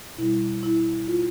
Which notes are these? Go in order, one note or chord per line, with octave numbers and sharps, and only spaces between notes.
B2 G3 E4
E4
F4